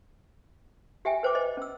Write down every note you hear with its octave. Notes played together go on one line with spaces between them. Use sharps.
G4 E5 G5 G#5
B4 C5 G5 D6
C5 D#5
C#4 E6